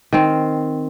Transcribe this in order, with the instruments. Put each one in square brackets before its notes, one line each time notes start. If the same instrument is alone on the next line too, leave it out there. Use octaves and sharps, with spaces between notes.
[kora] D#3 C4